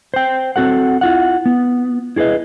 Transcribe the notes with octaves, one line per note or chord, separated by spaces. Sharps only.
C5 G5
C4 F#4 A4 F#5
E4 F4 F#5
B3
E4 G#4 A4 B4 D#5